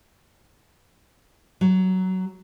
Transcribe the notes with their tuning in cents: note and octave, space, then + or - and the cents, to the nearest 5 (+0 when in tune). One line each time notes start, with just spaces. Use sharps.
F#3 +15